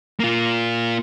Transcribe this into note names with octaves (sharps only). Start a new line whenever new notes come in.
A#3 F4